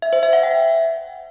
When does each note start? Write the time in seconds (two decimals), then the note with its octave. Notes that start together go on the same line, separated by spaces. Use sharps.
0.02 E5
0.13 C5
0.23 E5
0.33 F#5
0.43 G5